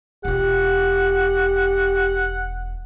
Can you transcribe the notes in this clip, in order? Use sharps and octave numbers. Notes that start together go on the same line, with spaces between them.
E1 F4 G4 F#5